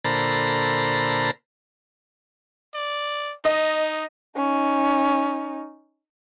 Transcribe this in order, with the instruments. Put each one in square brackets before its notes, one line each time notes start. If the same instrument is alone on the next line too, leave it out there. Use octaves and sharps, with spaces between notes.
[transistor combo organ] A#2 D3 A4 C5 A#5 B5
[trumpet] D5
[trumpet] D#4 [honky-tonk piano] D#5
[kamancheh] C#4 D#4